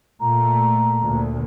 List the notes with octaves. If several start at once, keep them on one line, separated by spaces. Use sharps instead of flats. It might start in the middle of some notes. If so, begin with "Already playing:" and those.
A#2 A3 A#5
D2 A#2